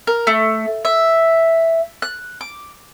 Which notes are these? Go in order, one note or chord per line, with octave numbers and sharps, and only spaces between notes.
A#4
A3
E5
F#6
D6